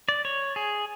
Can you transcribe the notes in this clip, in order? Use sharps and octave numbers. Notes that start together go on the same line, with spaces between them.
D5
C#5
G#4